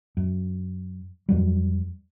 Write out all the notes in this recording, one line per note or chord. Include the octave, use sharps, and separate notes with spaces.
F#2
F2 F#3 G3